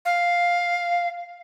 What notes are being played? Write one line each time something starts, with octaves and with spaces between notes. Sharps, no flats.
F5